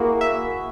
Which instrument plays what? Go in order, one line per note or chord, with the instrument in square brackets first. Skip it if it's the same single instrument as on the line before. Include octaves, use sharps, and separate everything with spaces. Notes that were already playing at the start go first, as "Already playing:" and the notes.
Already playing: [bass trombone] A#3 [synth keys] E4 F#4 G#4
[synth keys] E5